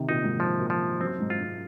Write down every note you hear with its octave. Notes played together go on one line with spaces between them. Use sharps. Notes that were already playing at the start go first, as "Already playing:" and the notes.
Already playing: C3 D#3
A#2 D#4
G#2
F3
A#2
F3
F#2 C4
G#2
F4
G#2